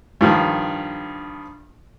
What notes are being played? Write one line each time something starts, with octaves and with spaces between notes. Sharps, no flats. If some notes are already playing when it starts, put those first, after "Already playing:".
G2 D#3 F3